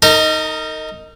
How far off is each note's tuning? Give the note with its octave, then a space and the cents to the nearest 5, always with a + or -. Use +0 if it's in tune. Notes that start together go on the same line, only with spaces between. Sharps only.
D#4 +5 A#4 -35